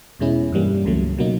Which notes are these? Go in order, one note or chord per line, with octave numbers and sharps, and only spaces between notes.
E2 B2 G#3 C#4 E4
G2 E3 G3 A#3
C#2 C#3 F#3 A3
B2 F#3 A#3 D#4